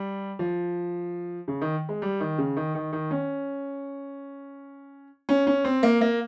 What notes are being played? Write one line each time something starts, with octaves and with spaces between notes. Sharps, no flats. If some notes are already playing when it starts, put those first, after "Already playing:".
Already playing: G3
F3
C#3
D#3
G#3
G3
D#3
C#3
D#3
D#3
D#3
C#4
C#4
C#4
C4
A#3
A#3